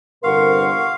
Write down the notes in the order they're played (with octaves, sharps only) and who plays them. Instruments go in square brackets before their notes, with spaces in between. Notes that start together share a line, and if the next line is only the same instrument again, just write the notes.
[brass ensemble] G1 C3 A#4 [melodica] F5 [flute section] F#5 C6 C#6